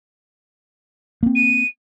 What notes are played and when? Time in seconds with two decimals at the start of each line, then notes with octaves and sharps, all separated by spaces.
1.23 A#3 C4
1.35 D#7